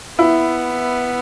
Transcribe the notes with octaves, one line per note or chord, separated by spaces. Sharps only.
B3 E4